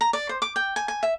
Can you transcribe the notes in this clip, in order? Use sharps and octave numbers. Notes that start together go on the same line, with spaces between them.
A#5
D5
C5
D6
G5
G#5
G#5
E5